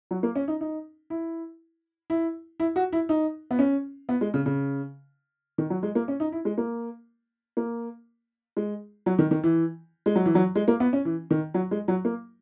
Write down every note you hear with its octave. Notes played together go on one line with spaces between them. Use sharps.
F#3
A#3
C#4
D#4
D#4
E4
E4
E4
F#4
E4
D#4
B3
C#4
B3
G#3
C#3
C#3
D#3
F#3
G#3
A#3
C#4
D#4
E4
G#3
A#3
A#3
G#3
F#3
D#3
D#3
E3
G#3
F#3
E3
F#3
G#3
A#3
B3
C#4
E3
D#3
F#3
G#3
F#3
A#3